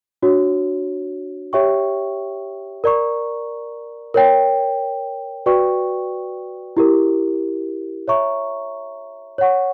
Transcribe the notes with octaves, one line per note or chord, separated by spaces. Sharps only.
D4 F#4 C#5
G4 C#5 E5 G5 C#6
A#4 D5 A#5 C#6
A#4 C#5 G5
F#4 B4 D5 G5 C#6
E4 G4 A#4
C#5 E5 A#5 C#6
C#5 F#5 C#6